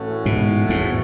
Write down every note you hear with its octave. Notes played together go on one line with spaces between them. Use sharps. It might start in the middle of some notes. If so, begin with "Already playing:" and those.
Already playing: A2 E3 A3 C#4 F#4
G#2 B2
E2 G#2